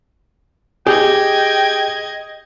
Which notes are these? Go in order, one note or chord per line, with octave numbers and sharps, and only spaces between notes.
G4 G#4 D#5 G5 G#6